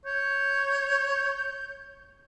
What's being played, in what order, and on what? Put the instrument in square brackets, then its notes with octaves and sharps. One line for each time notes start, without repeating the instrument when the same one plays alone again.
[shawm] C#5 [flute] G6